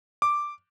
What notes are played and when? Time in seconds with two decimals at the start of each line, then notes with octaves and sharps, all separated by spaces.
0.22 D6